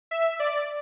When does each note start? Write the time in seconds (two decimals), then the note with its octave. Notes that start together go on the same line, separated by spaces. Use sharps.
0.11 E5
0.40 D5